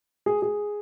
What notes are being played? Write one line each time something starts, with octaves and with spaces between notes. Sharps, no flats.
G#4
G#4